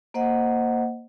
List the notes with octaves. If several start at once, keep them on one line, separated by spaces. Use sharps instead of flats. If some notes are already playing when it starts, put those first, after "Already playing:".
A#3 C5 D#5 F#5